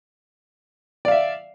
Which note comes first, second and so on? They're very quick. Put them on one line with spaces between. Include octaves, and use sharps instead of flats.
D5 F5 E5